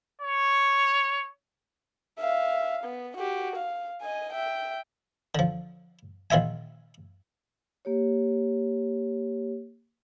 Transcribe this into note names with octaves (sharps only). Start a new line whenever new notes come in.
C#5
E5 F5
B3
F#4 G4
F5
D#5 G#5
E5 G5
D3 F3
A#1 D#3 F4 E5 G#5
A#3 G4 C#5